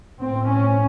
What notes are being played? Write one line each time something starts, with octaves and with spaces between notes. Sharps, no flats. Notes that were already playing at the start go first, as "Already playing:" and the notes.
A2 C4
C#4